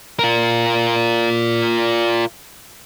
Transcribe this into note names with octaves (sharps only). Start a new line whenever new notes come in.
F4 A#4